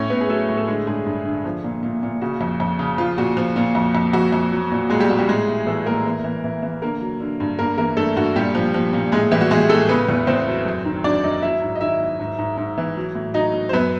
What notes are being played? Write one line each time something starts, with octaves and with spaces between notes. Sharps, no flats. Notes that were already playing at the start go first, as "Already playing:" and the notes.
Already playing: A2 C#4 C#5
A2 B3 B4
G#4
F#3 A3 A4
A2
A4
D3 G#3 G#4
G2 G#3 G#4
G2
D3
F3
A#2
A#2
A#2
C#3 F#4
F2
F2
C#3
F3 F4
A#2 F#4
F3
A#2
F2
F2
F2 F#4
F2
F#3
A#2
A#2 G#3 G#4
G3 G4
A#2 F#4
G3 G4
A2 G#3 G#4
A2
E3 A3 A4
A2 A#3 A#4
E3
E3
E3
E3
D3 A#3 A#4
F#3
D3
G2
G2 A#3 A#4
E3 A#3 A#4
G2 A3 A4
G2 F#4
A#2 G3 G4
F3
F3
A#2
A2 G#3 G#4
E3 G3 G4
F#4
E3 G#3 G#4
A2 A3 A4
C#3 B3 B4
E2
E2 C4 C5
F#3
F#2
D#3
F#3 D4 D5
F#2 D#4 D#5
F#3 E4 E5
G#2
D#5
D#3 E4 E5
F#3
G#2
G#2
G#2
E3
F#3
A2
F#3 D#4 D#5
F#3
C5
F#2 B3 B4